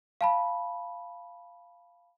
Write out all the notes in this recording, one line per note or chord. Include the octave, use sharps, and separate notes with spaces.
F5 A5 B5